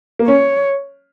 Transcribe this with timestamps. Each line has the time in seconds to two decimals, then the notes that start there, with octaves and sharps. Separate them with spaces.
0.19 A#3
0.27 C#4 C#5